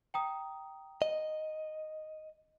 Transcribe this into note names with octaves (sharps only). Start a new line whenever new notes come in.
G5 A#5 D#6
D#5